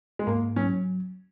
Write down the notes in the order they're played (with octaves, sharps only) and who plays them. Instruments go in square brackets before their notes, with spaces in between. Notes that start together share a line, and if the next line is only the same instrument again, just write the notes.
[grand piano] G#3
[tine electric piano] G#2 [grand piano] A#3
[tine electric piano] F#3 [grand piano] C#4